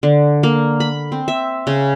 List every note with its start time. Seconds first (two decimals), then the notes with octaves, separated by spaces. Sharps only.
0.03 D3
0.43 A#3
0.80 B5
1.12 C4
1.28 E5
1.67 C#3